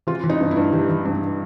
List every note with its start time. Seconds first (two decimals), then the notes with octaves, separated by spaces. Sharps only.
0.07 E3 F4
0.24 E3
0.30 D#4
0.41 G2
0.51 E4
0.57 G2
0.72 E3 G4
0.89 E3
1.05 G2